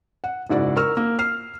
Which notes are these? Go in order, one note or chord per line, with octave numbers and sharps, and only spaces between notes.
F#5
F#1 G#2 E4 F#4 D5
A#4 C#6 E6 F6
A#3
F6 C7